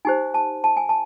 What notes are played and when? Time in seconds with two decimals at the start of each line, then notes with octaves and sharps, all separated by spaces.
0.05 D#4 G4 C5 G#5
0.34 A5
0.64 A5
0.77 G#5
0.89 A5